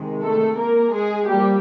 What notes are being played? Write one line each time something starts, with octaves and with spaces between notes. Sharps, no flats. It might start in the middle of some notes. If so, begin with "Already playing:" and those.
Already playing: C3 D#3 G#3
A3 A4
A#3 A#4
G#3 G#4
F3 G3 A#3 G4